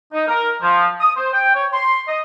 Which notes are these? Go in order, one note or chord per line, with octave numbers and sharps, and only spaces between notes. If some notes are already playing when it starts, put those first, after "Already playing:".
D#4
A#4
F3
D#6
C5
G5
C#5
C6
D#5